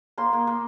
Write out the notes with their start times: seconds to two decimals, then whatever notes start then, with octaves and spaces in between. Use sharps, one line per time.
0.17 A#3 C6
0.33 A#3
0.47 A#3